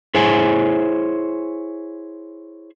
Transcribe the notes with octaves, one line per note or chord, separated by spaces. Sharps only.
E4 G#4 C5 C#5 G#5